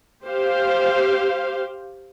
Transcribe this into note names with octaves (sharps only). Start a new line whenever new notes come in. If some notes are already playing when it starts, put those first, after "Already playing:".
G4 C5 F5